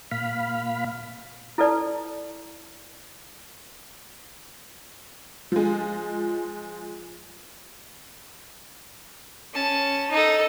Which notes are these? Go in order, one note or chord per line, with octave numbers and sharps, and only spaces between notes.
A#2 F5 B5
E4 A4 B4 D5 A5
F3 G#3
C#4 A5
D#4 A4